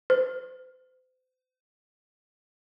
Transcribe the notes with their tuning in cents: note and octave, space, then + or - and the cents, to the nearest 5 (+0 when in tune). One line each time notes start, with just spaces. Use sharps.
C5 -40